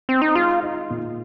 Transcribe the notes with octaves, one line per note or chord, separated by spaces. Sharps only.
C4
D#4
G#3 F4
D#4
A#2